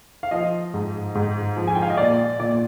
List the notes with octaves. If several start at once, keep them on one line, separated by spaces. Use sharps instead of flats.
F5
F3 D#5
G#2
G#2
F3
G#5
G5
F5
D#5
A#2 D5
A#2 D5